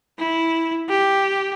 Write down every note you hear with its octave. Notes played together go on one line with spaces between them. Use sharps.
E4
G4